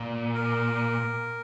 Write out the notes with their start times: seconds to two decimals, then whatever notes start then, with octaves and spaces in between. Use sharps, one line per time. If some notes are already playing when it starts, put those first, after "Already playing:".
Already playing: A#2
0.35 A#4